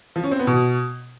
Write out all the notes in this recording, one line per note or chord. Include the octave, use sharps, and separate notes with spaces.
F3
C#4
C4
B3
B2